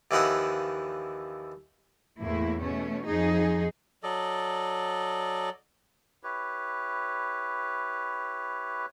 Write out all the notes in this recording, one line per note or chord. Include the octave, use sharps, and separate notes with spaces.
D#2 E3 F3 E4 D#5 F#5
E2 A2 A#3 E4
B2 A3 C#4
F2 F3 D#4 G#4
F#3 A4 D5 D#5
E4 G4 B4 C#5